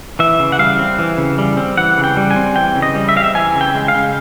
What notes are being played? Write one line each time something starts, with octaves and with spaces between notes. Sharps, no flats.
E3 E5
C#3
F#5
G3 F5
C4
E3
C#3
G3
C4
E3 F#5
C#3
G5
G3
G#5
C4
E3 G5
C#3
D#5
G3
E5
C4 F5
E5
E3 G#5
C#3
G5
G#3
F5
C#3